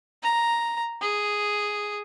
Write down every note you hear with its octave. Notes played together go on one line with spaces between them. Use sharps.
A#5
G#4